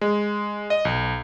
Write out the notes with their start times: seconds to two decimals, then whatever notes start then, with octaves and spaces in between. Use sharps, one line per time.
0.01 G#3
0.70 D#5
0.85 B1